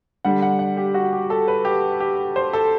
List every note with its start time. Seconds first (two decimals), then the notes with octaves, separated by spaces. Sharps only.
0.25 D3 G3 D4 F#5
0.42 F#5
0.59 F#5
0.77 G4
0.94 F#4
1.13 G4
1.30 A4
1.48 B4
1.65 G4
2.00 G4
2.36 C5
2.53 A4